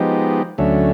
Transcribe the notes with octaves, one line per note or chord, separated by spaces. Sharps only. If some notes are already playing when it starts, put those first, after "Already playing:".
Already playing: F3 G#3 B3 D#4 G4
D2 D3 F#3 A3 C#4